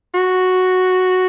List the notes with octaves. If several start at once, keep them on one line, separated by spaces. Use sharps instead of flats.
F#4